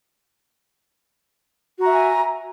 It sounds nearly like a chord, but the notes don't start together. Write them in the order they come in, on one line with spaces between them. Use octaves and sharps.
F#4 A#5 E5 G#5